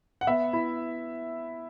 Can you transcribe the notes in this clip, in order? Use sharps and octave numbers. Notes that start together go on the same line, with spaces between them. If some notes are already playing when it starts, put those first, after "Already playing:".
F#5
B3 E5
E4